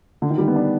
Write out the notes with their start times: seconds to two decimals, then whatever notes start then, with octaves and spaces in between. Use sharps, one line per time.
0.22 D3
0.30 D#3
0.38 G3
0.48 B3
0.56 D4